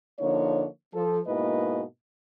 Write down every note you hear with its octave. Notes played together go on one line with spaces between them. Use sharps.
D3 F3 A#3 D#4 C#5
F3 A4
G#2 B2 A#3 E4 B4 D#5